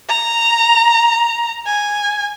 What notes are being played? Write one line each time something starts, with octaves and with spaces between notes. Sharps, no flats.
A#5
G#5